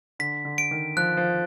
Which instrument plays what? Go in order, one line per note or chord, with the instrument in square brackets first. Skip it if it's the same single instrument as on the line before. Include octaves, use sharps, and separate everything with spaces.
[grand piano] D3 [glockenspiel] B6
[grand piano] D3
[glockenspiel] D7
[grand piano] D#3
[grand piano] F3 [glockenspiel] F#6
[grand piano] F3